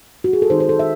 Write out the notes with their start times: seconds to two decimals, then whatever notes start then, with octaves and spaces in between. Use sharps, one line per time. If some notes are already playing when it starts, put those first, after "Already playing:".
0.24 F#4
0.33 G#4
0.42 A4
0.50 D#3 G#3 D#4 C5
0.60 C5
0.69 A4
0.79 E5